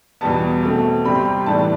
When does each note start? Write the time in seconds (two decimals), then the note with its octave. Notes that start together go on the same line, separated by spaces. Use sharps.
0.21 E2 B2 G3 B3 A5
0.63 B2 A3 C4
1.05 C3 G3 C4 B5
1.15 C6
1.25 B5
1.46 A2 E3 G3 B3 D4 A5